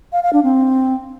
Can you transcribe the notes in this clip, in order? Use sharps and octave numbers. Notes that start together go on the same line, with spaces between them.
F5
F5
D4
C4